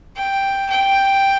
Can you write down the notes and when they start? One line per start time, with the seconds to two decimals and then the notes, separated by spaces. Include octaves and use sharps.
0.16 G5
0.70 G5